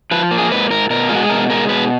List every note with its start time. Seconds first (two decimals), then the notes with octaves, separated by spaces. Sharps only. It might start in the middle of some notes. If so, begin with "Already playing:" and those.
0.11 F3 B4
0.31 A#3
0.38 G#4
0.51 G#2 B4
0.70 G#2 A#4
0.90 B2 A#4
1.09 G#3 F4
1.16 F#4
1.23 G#4
1.29 B2 A#4
1.50 G#3 A#4
1.69 B2 B4